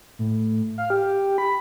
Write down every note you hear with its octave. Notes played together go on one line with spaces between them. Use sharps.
A2
F5
G4
B5